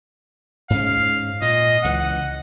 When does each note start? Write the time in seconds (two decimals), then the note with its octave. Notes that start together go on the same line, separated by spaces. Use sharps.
0.70 G#2 C#4 F5
1.42 A#2 D#5
1.84 C#2 E3 F#5